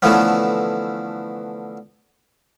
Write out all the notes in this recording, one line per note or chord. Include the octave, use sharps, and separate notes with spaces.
D3 E3 F3 A3 B3 C#4